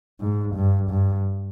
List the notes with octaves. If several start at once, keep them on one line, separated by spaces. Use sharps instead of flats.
G#2
G2
G2